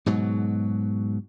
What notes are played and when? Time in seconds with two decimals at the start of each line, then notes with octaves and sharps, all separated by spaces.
0.06 G#2 B2 F#3